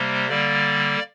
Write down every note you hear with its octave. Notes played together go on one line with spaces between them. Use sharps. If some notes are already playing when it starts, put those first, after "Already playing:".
Already playing: C3 G3 A#3 C5
D3 G3 A#3 D5